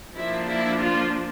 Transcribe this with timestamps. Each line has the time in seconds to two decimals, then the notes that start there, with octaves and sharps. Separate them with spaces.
0.16 F3 A#3 D4 E4
0.49 E4
0.80 F4